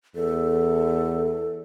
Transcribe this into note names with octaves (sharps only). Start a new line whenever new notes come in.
E2 A4